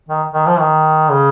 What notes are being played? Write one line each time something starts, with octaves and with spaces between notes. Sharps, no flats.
D#3
D#3
F3
D#3
C#3